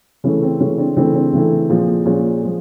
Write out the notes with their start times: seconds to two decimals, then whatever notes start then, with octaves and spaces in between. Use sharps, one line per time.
0.24 C#3 E3 A3 C#4
0.42 C4
0.60 C#3 E3 A3 C#4
0.78 C4 D4
0.97 C#3 E3 A3 C4 D4
1.14 C4 D4
1.33 C#3 E3 A3
1.70 A#2 F3 G#3
2.06 A#2 F3 G#3 C#4
2.42 F3 G#3